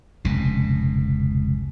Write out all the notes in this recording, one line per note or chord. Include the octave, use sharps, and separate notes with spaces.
F1 C#2 B2